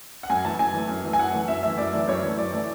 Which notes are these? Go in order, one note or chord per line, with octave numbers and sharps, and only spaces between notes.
F#5
F#2 G#5
E3 A3 A5
F#2 G#5
E3 A3
F#2
E3 A3
G#5
F#2 F#5
E3 A3
F#2 E5
E3 A3 E5
F#2 D5
E3 A3
F#2 C#5
E3 A3
F#2 D5
E3 A3